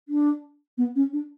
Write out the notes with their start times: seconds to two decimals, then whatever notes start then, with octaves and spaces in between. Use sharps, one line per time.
0.09 D4
0.78 B3
0.96 C#4
1.13 D4